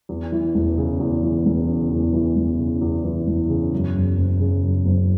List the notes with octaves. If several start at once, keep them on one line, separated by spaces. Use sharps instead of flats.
E2
E3
E1
C#3
E2
E3
E1
C#3
E2
E3
E1
C#3
E2
E3
E1
C#3
F#2
F#1
F#1
C#3
F#2
F#1